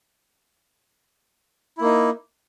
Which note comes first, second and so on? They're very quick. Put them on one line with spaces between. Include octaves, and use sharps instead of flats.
E4 A#3 D#4